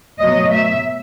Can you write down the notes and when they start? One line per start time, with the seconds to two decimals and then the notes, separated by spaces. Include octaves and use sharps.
0.20 B2 F#3 A3 D#5
0.53 E5